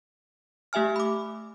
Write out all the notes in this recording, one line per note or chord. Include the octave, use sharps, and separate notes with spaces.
A3 G4 E5 G#5 F6
B5 D6